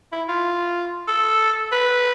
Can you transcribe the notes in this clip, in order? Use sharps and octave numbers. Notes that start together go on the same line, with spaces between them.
E4
F4
A4
B4